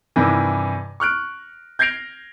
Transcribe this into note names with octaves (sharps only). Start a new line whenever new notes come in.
G2 C3 D#3 E3
C#6 F6 F#6 D7
G6 G#6 A#6 C7 D7 F7